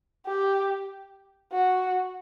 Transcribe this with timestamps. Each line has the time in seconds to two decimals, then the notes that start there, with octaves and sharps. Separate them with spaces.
0.26 G4
1.52 F#4